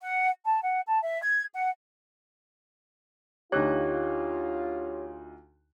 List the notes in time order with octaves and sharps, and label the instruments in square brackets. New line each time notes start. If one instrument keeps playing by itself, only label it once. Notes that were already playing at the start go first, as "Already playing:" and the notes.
[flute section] F#5
A5
F#5
A5
E5
G#6
F#5
[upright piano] D2 D#4 F#6 [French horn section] F4 [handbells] G4 C#5